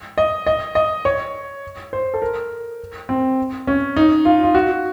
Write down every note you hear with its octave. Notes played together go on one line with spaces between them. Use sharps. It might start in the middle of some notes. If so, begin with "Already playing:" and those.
D#5
D#5
D#5
C#5
C5
A4
A#4
C4
C#4
D#4
F4
F4
F#4